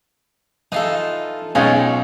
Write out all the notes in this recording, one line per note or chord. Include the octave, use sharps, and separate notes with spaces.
E3 D#4 F4 A4
B1 G#3 C#4 D#4 F4 C#5 G5